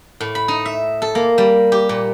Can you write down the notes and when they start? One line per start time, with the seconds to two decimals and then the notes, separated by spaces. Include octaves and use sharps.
0.20 A2
0.35 B5
0.48 D#4
0.65 E5
1.02 A4
1.15 A#3
1.38 G3
1.72 G4
1.89 A#2